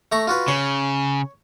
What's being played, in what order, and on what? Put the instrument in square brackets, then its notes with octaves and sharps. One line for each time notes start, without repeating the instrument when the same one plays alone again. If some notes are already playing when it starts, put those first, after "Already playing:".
[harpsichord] A3 A#5 C#6
F4 F#4 B4
[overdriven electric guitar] C#3 [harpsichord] C#5